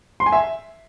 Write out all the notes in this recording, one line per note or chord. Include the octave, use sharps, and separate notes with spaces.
C6
G#5
E5